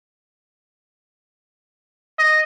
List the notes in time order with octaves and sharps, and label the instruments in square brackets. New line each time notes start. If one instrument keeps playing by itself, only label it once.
[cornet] D#5